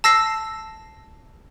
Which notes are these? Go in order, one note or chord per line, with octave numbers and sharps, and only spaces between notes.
A5 E6 A#6 C7